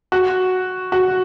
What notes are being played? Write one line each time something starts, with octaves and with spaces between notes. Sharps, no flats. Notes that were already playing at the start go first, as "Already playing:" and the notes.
F#4
F#4